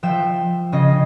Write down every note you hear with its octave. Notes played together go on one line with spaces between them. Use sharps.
F3 E5 G5 E7
C#3 C#4 D#5